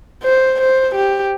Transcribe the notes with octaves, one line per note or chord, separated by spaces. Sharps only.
C5
C5
G4